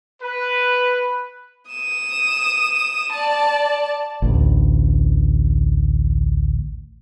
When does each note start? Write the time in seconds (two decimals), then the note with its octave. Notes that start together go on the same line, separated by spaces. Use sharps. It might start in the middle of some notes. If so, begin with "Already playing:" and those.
0.21 B4
1.71 D#6 E7
3.12 D5 A5
4.22 A1 D2